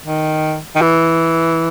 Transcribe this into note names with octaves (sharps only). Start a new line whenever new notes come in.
D#3
D#3
E3